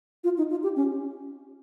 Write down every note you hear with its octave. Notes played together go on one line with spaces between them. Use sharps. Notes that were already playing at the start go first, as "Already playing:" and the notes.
F4
D#4
F4
G4
C#4